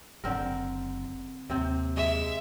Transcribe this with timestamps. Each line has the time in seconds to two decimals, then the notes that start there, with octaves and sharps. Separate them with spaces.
0.24 F#1 D3 C4 A#4
1.50 D#2 C3 C4
1.97 G#3 E5